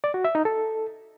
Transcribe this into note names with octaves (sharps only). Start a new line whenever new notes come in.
D5
F#4
E5
D#4
A4